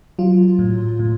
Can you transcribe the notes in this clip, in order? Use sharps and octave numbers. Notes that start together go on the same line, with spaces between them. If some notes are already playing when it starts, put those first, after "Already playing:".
F#3 F4
A2
A2